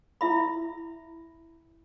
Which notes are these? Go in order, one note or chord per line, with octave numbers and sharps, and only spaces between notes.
E4 E5 B5